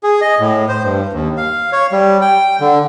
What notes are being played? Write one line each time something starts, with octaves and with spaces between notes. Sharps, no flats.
G#4
D#5
A2
C5
G2
D#2
F5
C#5
G3
G5
D3